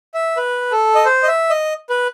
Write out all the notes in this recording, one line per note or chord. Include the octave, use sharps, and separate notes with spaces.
E5
B4
A4
D#5
C5
D#5
E5
D#5
B4